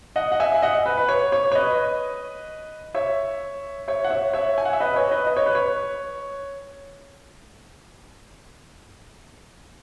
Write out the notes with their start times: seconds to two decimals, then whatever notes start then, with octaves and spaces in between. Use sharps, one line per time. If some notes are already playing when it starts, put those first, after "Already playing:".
0.16 D#5 F#5
0.32 F#5
0.40 E5 G#5
0.52 E5
0.62 D#5 F#5
0.86 B4
0.97 B4
1.09 C#5
1.32 C#5
1.52 C#5
1.55 B4 D#5
2.95 C#5 E5
3.88 C#5 E5
4.04 F#5
4.10 C#5 E5
4.33 C#5 E5
4.58 G#5
4.65 F#5
4.73 E5
4.80 B4 D#5
4.96 C#5
5.11 B4 D#5
5.27 D#5
5.36 C#5
5.46 B4
5.55 C#5